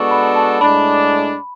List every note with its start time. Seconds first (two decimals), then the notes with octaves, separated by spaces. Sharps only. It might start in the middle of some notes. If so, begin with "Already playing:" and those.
Already playing: G#3 B3 D4 F#4 A4 C#6
0.11 B5
0.36 A5
0.61 A2 G#3 D4 B5